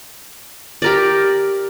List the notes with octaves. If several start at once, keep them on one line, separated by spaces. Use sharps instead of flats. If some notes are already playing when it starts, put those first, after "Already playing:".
G4 A#4 D5